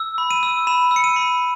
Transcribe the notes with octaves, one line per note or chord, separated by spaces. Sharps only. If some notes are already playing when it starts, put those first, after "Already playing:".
Already playing: E6
B5
D#7
E6
B5 E7
E6
C#7
D#7
B5